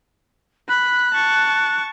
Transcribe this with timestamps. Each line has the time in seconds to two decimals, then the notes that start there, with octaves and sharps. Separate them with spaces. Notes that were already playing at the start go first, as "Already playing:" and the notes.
0.69 B5 F#6
1.14 A5 C#6